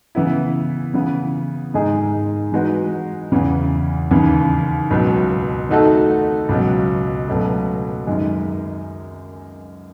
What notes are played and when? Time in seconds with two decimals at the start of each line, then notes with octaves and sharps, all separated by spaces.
0.15 C#3 E3 B3 E4
0.94 C#3 E3 B3
1.74 G#2 D#3 G#3 D#4 G#4
2.52 E3 G#3 D#4 F#4 B4
3.32 E2 C#3 E3
4.11 D#2 C#3 E3
4.90 C#2 B2 F#3
5.69 D#3 A3 D#4 F#4 A4
6.49 C#2 B2 F#3
7.28 C#2 B2 F#3 A3
8.07 F#2 D#3 G#3 D#4